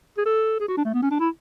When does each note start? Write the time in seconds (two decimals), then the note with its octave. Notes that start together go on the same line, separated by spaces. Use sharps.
0.18 G#4
0.25 A4
0.60 G#4
0.68 F#4
0.77 D4
0.85 A3
0.94 B3
1.02 C#4
1.11 D4
1.20 E4